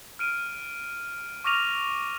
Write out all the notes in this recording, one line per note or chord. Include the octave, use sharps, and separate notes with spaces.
F6 D7 D#7
C#6 D6 F6 A#6 D#7 F7